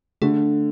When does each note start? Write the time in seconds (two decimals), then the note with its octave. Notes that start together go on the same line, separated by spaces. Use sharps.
0.22 D3 A3